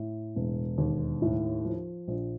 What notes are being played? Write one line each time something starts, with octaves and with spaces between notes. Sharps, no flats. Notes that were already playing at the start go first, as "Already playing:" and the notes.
Already playing: A2
E1
D#2
A2
F3
A#1